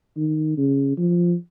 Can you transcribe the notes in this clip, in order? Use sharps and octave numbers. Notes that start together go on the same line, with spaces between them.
D#3
C#3
F3